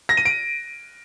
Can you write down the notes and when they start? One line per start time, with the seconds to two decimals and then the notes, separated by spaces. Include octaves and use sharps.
0.09 A#6
0.17 D#7
0.25 D7